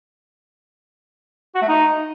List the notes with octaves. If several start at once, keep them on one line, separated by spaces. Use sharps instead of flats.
F#4
A3
D#4